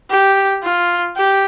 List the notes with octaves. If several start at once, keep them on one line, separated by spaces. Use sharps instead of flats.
G4
F4
G4